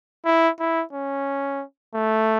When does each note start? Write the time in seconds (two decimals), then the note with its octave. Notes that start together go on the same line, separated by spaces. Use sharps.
0.25 E4
0.59 E4
0.93 C#4
1.95 A3